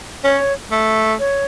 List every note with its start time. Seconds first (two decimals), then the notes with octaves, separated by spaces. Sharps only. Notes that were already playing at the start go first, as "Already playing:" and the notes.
0.24 C#4 C#5
0.71 A3
1.19 C#5